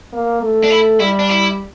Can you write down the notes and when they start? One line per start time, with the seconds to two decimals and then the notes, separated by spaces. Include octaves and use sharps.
0.13 A#3
0.42 A3
0.64 D4
0.71 E4
1.00 G3 E4
1.19 D4
1.29 E4